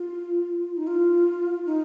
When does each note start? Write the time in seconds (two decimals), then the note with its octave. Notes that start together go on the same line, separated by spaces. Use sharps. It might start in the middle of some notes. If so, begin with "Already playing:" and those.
Already playing: F4
0.77 D#4
0.87 F4
1.66 D#4